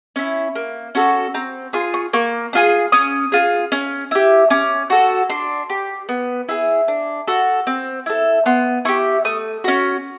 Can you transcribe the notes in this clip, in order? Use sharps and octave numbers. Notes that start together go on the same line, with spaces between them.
C#4 E4
A#3
C#4 F#4 A4
C4 A#5
F4 G#4 C6
C#6
A#3 C#6
D4 F4 G#4
C#4 D#6
F4 G#4
C#4
E4 G4
C#4 D6
F#4 A4
D4 C6
G4
B3
E4 G#4
D4
F#4 A4
C4
E4 A4
B3 C6
E4 G4 C#6
A3 D#6
C#4 F#4